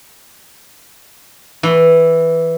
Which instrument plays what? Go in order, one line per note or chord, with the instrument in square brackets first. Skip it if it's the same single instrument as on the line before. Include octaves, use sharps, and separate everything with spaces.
[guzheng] E3